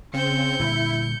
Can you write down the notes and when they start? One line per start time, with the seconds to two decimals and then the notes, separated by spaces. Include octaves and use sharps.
0.13 C#3 C4 G6 C#7
0.60 A#2 D3 G3 E4